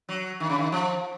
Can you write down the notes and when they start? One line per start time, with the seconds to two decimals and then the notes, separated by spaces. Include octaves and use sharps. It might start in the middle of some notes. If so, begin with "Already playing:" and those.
0.09 F#3
0.40 D#3
0.49 C#3
0.58 D#3
0.72 F3